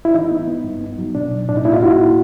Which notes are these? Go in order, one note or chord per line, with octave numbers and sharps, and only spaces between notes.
E4
E3 D#4
B3
B3
G2
B3
F#3
B2 D4
B2
A2 D4
D#4
A#3 D4 E4
D#4 F4
A#3 E4 F#4
A2